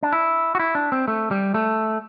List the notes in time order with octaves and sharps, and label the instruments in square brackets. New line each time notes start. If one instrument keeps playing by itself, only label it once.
[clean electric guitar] D4
E4
F#4
E4
D4
C4
A3
G3
A3